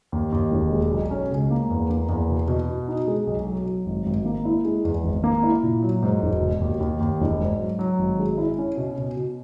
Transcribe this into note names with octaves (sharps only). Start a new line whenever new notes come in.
D#2
D#2
E1
G#3
B1
C#4
C#2
A#3
E2
A#3
E2
B2
B2
F#4
D#4
G#3
B1
F#3
F#3
G#1
G#1
A#3
E4
G#3
E2
G#1
A#3
E4
A#2
F#3
G#2
E1
B2
D#2
D#2
D#2
E1
G#2
F#3
F#3
G#1
G#3
E4
C#4
B2
B2
B2